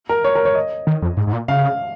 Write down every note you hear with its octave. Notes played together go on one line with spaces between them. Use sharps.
A#4
C#5
A#4
C#5
D#5
D#3
F2
G#2
G#2
A#2
C#3 F5